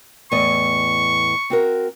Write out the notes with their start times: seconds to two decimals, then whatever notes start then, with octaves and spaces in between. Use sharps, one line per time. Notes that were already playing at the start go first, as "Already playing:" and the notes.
0.32 E2 A2 D#5 C#6
1.50 C4 F#4 A#4